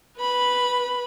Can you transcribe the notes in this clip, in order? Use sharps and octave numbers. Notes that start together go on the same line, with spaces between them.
B4 B5